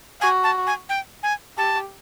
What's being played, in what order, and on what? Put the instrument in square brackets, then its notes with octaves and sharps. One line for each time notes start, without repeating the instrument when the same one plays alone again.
[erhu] F#4 [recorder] G#5
[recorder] A5
G#5
G5
G#5
[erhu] G4 [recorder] A5